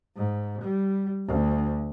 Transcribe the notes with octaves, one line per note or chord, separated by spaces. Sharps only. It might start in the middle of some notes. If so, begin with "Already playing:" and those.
G#2
G3
D2